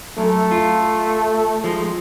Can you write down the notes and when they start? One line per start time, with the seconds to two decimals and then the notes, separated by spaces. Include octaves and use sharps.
0.18 F#2 A3
0.52 F4
1.64 F3 G#3